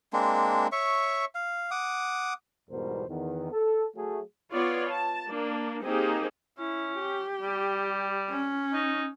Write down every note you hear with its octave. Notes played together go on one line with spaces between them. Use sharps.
G#3 A#3 C4 D4
C#5 E5 C#6
F5
F#5 D6 D#6
E2 G#2 B2 G3 A#4 C5
E2 D#3 B3
A4
F#3 A3 G#4
B3 F4 C#5 D5
A5
A#3 D4
A#3 C4 D#4 G4 G#4
C#4 E4
G4
G3
C#4
D#4